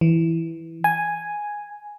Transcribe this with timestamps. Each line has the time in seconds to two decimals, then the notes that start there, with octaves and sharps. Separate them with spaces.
0.01 E3
0.84 G#5